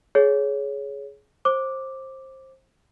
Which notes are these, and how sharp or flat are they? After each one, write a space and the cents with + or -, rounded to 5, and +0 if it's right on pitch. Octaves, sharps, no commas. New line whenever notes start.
G#4 +20 C#5 +10
C5 +20 D6 +0